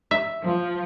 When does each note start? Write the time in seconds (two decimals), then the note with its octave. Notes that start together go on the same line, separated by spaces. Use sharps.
0.11 E5
0.43 F3